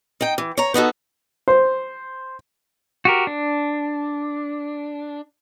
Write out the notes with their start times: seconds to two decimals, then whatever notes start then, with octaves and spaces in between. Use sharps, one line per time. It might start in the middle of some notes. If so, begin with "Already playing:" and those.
0.21 D#4 G5
0.38 E3
0.57 C#5 A#5
0.74 B3 D#4 F#4 A4
1.48 C5
3.05 F#4 G4 A#4
3.27 D4